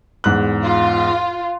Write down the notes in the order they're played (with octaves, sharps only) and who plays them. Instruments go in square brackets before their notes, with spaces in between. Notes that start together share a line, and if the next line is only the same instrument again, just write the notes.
[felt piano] E2 G#2 F#6
[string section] F4